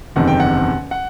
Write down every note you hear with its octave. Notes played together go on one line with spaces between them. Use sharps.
F#1 E2 C3 D#3 F#5
G5
F#5
F#5